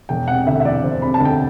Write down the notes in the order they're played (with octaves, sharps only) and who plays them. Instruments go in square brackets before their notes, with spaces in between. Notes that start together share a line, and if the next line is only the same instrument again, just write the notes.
[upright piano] E1 G5
C3 F#5
D2 E5
E5
E3 D5
E1 C5
C3 B5
A5
D2 G5